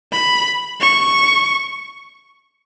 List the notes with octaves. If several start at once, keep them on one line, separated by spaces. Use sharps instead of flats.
B5
C#6